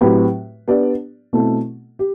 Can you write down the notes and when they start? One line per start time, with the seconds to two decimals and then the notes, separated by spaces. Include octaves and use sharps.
0.01 A2 F#3 C4 G4 B4
0.68 B3 D4 G4 D5
1.33 B2 A3 C4 E4 A4
1.99 G4